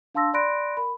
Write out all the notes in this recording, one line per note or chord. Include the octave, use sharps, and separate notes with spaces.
D4 F5 A5 C6 E6 A#6
D5 B5 C6 F#6 A#6 D7
A#4 B5